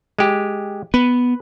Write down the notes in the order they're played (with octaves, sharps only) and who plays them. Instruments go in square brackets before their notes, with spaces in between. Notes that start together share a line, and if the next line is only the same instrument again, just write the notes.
[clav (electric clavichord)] G#3 G4
[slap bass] B3 [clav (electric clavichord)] B4